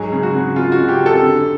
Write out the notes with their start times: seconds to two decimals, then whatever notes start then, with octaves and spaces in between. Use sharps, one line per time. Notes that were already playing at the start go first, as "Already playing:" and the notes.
Already playing: G#2 F#3 G#4
0.12 C#3
0.23 F#4
0.34 C#3
0.56 C#3 F4
0.72 F#4
0.78 C#3
0.89 G4
1.00 F2
1.06 A4
1.22 D3